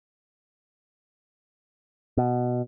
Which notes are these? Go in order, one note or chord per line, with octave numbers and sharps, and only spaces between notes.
B2